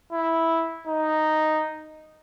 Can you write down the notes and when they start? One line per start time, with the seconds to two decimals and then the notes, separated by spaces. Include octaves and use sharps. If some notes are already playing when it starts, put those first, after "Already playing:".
0.13 E4
0.87 D#4